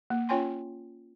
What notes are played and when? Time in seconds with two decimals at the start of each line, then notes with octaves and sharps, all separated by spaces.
0.10 A#3
0.29 C#4 F4 C#5 G5 G#5 C6